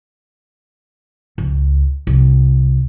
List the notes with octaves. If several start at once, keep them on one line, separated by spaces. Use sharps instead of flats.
C#2
C2